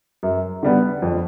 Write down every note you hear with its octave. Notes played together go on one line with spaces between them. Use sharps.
F#2
D3 G3 B3
F2